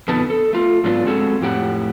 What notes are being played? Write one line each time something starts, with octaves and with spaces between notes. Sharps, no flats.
F2 B2 D3 B3 D#4 A5
A4
A3 F4
G#2 F#3 B3 D4 F4
G#3 C4 F#4 G#4 A4
F2 A2 G4 F#5